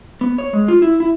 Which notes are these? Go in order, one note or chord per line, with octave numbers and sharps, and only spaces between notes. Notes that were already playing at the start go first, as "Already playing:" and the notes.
B3
C#5
G#3
F4
E4
E4